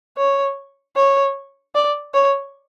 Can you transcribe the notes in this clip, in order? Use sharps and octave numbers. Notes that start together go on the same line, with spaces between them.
C#5
C#5
D5
C#5